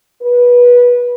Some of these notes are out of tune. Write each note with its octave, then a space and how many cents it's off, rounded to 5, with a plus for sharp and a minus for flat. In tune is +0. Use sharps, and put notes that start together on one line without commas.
B4 -20